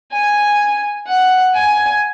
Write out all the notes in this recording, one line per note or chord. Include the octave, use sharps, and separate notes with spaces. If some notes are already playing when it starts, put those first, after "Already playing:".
G#5
F#5
G#5